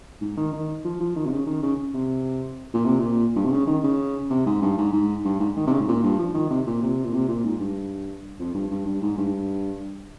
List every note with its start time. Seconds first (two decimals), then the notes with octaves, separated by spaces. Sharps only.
0.21 G#2
0.37 D#3
0.53 D#3
0.85 F3
1.01 F3
1.16 D#3
1.26 C3
1.31 C#3
1.47 D#3
1.62 C#3
1.94 C3
2.73 A#2
2.85 C3
2.99 A#2
3.36 G2
3.45 C3
3.51 C#3
3.67 D#3
3.84 C#3
4.30 C3
4.46 G#2
4.62 G2
4.78 G#2
4.93 G#2
5.25 G2
5.40 G#2
5.56 D#3
5.67 C3
5.72 C#3
5.80 G#2
5.88 A#2
6.03 G2
6.19 F3
6.34 D#3
6.50 C3
6.66 A#2
6.82 C3
7.04 A#2
7.14 C3
7.28 A#2
7.44 G#2
7.60 G2
8.39 F2
8.54 G2
8.71 G2
8.86 G2
9.02 G#2
9.18 G2